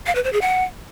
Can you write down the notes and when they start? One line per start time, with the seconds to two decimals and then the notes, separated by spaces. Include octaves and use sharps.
0.06 F5
0.15 B4
0.24 C5
0.33 G#4
0.42 F#5